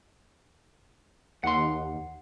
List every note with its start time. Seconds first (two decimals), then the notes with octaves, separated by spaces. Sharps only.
1.44 D#2 F#5 C6